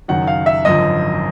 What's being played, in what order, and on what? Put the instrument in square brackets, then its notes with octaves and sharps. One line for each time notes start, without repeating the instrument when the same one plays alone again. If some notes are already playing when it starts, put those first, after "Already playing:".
[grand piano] F#1 F#2 D#3 F#3 F#5
F5
E5
G#1 F#2 D3 F3 D#5